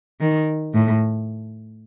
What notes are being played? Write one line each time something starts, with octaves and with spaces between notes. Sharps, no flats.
D#3
A2